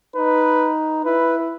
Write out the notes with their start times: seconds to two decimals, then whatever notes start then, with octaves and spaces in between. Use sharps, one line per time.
0.16 D#4 B4
1.05 E4 B4